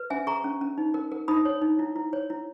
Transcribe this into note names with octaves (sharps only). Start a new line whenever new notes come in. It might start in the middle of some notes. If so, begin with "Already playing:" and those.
Already playing: B4
C#4 E5 G#5
G#4 A#5 C#6
C#4
C#4
D#4
A#4
A#4
D#4 B5 D#6
C#5
D#4
E4
E4
C#5
E4